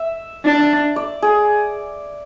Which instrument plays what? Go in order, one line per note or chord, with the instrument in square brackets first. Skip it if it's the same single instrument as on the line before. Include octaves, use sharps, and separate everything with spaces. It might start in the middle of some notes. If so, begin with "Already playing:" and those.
Already playing: [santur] E5
[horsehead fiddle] D4
[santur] D5
G#4